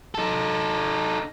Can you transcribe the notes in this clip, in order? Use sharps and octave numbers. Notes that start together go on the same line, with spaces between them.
D#4 A4